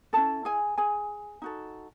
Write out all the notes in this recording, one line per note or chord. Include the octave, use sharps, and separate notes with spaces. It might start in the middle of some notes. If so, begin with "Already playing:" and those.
C#4 E4 G#4 A4 A5
G#4 G#5
G#4 G#5
D#4 F#4 A4